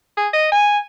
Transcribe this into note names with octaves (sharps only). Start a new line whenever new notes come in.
G#4
D#5
G#5